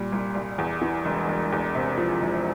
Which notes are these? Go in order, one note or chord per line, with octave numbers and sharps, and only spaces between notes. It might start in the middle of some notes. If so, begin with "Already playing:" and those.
Already playing: A#2 G3
C2
C2
E2
E3
E1
E1
E2
C3
F3
E1